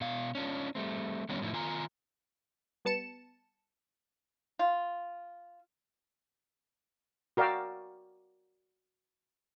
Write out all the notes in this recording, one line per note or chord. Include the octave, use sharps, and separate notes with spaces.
B2 F5
C#4 D4 F4
G3 A3 C4
D3 D#3 F#3 G3 B3 C#4
A2 F3 C4 E4
D#3 F4 G#5 A#5
G3 B3 A5 C#7 E7
F4
F#4 A#4 D5 F5 G5 E6